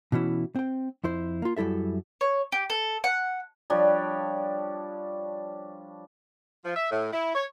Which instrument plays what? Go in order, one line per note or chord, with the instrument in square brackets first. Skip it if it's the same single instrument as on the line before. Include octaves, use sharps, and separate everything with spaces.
[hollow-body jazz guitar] B2 E3 C#4 E4
C4 G5
F2 E4 C5
A#3 F4
F#2 G3 E4 A4 E5
[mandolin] C#5
G4
A4
F#5
[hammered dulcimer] F3 G3 D4 C#5
[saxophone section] F3
E5
A2
E4
C#5